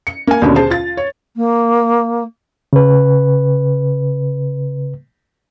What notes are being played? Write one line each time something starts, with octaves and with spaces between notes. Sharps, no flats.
C#7
A#3 G#5
D#2 B2 D3 C#4 D4
G#4 C5 A5
F4 A6
C#5
A#3
C#3 B4